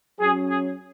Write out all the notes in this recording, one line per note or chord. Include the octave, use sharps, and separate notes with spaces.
F#2 F#3 C#4 G#4
G#4